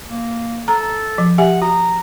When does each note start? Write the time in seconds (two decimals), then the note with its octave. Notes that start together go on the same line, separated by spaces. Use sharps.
0.09 A#3
0.68 A4 A#5
1.18 F3
1.38 G4 E5 F#5 G#5
1.62 F#4 A#5